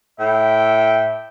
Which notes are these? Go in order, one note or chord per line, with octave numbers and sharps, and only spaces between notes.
A2 E5 G5